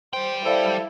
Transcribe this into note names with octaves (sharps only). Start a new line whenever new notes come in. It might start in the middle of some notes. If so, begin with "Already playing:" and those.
G3 C5 G5
E4 A4 C5 D5 F5